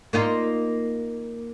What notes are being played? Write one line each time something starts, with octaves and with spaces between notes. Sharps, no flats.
A#3 D#4 F4